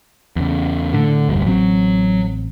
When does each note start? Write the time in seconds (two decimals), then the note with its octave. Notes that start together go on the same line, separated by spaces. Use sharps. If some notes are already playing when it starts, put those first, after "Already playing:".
0.36 E2 C#3
0.94 A2 D3
1.29 F1 D2 G2
1.46 A1 F#3 C4